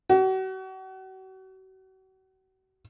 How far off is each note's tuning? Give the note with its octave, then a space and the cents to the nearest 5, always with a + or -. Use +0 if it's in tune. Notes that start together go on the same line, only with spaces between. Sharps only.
F#4 +40